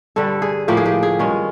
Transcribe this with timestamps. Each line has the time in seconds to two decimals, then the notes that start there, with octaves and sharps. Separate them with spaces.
0.16 G2 D3 G3 A4
0.42 G#4
0.68 A2 F3 A#3 G4
0.77 G#4
0.86 G4
1.03 G#4
1.19 G2 D#3 G#3 C#4